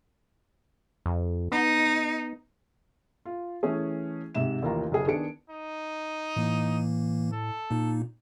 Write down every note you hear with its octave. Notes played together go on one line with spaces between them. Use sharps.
F2
B3 D#4
F4
E3 A3 C#4 G#4
G#2 C3 E5 E7
A1 D#2 A#3 F4 F5 A#5
F#1 G#4
D#3 B3 D4 G#4 C#7 D7
D#4
A2 E3 A#3
A4
A#2 A#3 D#4